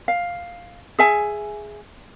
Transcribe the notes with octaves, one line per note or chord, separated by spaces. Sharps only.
F5
G#4 E5 G#5